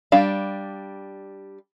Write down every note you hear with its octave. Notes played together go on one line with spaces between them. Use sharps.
G3 D4 F5